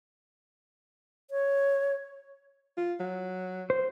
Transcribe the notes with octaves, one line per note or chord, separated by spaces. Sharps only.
C#5
F4
F#3
C5